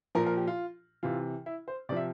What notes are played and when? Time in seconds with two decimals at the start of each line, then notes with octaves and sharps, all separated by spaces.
0.15 A#2 F3 A#4
0.26 A#4
0.37 G4
0.47 F4
1.03 C3 E3 F4
1.46 E4
1.68 C5
1.89 C3 D5
1.92 F3 E5